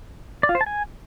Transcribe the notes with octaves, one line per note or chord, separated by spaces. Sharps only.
D5
F4
C5
A5
G#5